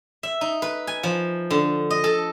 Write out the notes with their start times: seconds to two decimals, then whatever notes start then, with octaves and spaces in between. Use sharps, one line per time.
0.23 E5
0.41 D#4
0.62 B4
0.87 G#5
1.03 F3
1.50 D3
1.91 D#5
2.04 A4